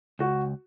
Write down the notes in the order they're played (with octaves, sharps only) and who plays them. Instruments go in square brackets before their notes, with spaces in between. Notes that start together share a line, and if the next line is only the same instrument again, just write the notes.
[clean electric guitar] C#2 [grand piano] F#4